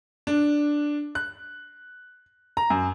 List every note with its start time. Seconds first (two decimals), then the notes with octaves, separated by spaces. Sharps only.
0.27 D4
1.15 F#6
2.57 A#5
2.70 F#2